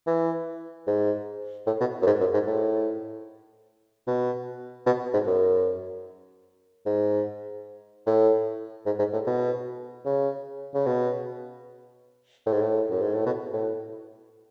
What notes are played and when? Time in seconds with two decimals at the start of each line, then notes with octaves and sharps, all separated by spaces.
0.07 E3
0.87 G#2
1.66 A2
1.80 B2
2.02 F#2
2.06 G#2
2.20 F#2
2.34 G#2
2.47 A2
4.07 B2
4.86 B2
5.14 G#2
5.27 F#2
6.86 G#2
8.07 A2
8.86 G#2
8.99 G#2
9.13 A2
9.27 B2
10.06 C#3
10.74 C#3
10.86 B2
12.46 A2
12.53 G#2
12.62 A2
12.90 F#2
13.02 G#2
13.15 A2
13.26 B2
13.53 A2